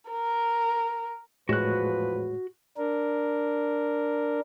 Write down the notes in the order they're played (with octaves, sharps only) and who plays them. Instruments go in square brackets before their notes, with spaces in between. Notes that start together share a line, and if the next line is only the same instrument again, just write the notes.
[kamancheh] A#4
[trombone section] E2 F3 B4 [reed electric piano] A2 G#3 C#5 [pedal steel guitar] F#4 F#6
[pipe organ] D4 A#4